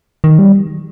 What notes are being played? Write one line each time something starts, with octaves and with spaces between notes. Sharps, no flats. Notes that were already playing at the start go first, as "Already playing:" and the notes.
D#3
G3